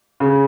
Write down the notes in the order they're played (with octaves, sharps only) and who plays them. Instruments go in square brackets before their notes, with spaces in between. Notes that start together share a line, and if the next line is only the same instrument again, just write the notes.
[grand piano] C#3